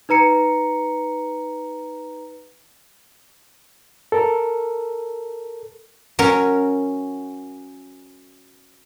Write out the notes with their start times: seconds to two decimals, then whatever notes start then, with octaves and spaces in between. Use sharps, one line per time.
0.09 D#4 B4 A#5 C#7
4.12 A4 A#4
6.19 F#3 C#4 A#4